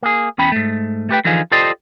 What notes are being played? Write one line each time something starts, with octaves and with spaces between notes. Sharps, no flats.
A#3 G#4
E2 C#4 G5 B5
G#2 A3
A3 G4 B4 G5
D3 E3 F3 D#4 F4 G#4
F4 G4 A4 C5 D5 D#5